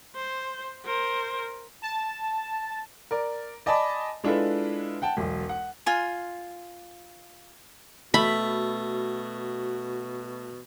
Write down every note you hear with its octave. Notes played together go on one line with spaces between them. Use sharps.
C5
A#4 C5
A5
A#4 D5
D5 D#5 G#5 A5 B5 D6
G#3 D4 E4 F4 A4 B4
F#5 G5 A5
E1 B1
F#5
F4 G#5 C6
B2 A3 F#4 B5